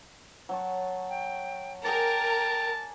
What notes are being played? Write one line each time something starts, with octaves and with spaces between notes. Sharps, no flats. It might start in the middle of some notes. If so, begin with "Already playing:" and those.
F#3 A5 C#6
G5
G#4 A#4 D5 G5 A5